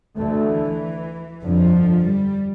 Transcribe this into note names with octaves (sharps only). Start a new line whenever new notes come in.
D2 D3 E3 A3
G1 F2 D3 F3
G3